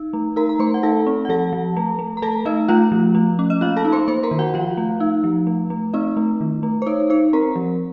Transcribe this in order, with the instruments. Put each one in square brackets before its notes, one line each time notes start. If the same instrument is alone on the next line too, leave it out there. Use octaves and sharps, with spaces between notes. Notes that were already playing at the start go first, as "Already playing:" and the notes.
Already playing: [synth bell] D#4
A3
D#4 A#4 A#5
A#5
A3 C5 C6
F#5
D#4 A4 A5
C4
F#5
F3 A4 A5
F3
A3
A3
A#5
A3 A4 A5
A3 D#4 D#5
A3 F4 F5
F3
A3
C#4
D#5
A#3 F4 F5
A4 A5
D#4
C5 C6
A#3 C5 C6
A#4 A#5
D#3
F#4 F#5
F3 F4 F5
A3
D#4
F3
A3
A3
C4 D#4 D#5
A3
D#3
A3
C5
D#4 C#5
D#4 C5
C4 A#4 A#5
F3